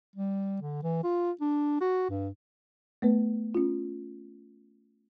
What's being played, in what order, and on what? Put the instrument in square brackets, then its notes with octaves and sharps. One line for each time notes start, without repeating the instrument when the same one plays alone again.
[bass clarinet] G3
D3
E3
F4
D4
F#4
G2
[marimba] A3 B3 B4
C#4 F4